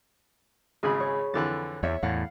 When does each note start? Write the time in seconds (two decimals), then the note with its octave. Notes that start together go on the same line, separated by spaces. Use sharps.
0.83 G#1 C#3 G#4 B5
1.00 C#5
1.34 F2 D3 E3 F#6 A6
1.83 E2 C#5 E5
2.03 E2 A2 F5 F#5